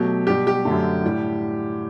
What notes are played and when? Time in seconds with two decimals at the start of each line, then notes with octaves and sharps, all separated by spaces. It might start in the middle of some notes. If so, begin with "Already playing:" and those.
Already playing: B2 F#3 A3 G4
0.27 B2 G3 G4
0.47 G4
0.65 F#2 D3 A3
1.04 A2 G3